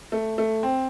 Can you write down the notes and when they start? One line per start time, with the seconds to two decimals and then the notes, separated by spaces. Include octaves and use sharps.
0.12 A3
0.38 A3
0.63 C4